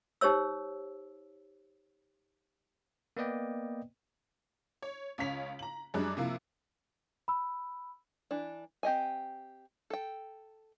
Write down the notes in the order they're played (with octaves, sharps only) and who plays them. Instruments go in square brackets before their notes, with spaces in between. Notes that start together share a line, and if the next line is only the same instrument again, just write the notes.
[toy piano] D#4 G4 C5 C#5 E6
[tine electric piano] A#3 B3 B4 D5 D#5 G5
[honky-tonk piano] C#5
C#2 C#4 C#5 B6 F7
A#5 F#7
F#2 G3 G#3 D4 F#6
C3 F3 A#3 E4
[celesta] B5 E6
[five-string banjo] E3 D4
C4 G4 D#5 G#5
A4 G5